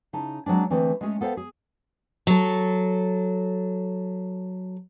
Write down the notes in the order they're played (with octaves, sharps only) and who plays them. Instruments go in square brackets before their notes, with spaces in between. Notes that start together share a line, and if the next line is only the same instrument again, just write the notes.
[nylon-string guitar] C#3 D#4 E4 A5
F#3 G#3 C4 D4
D3 E3 A3 C4 G4 G#4
G#3 A3 C#4 G#4
B3 A4 C5 C#5 F5 G5
G#4
[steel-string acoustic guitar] F#3 A4